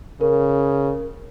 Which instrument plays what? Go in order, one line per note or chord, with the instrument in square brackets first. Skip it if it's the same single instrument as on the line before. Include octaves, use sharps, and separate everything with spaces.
[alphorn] C#3 [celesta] A#4